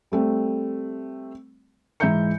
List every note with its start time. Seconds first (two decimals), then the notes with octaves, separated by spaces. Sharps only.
0.12 G3 A3 C4
2.00 G#2 E3 E5 A#5 G6 C#7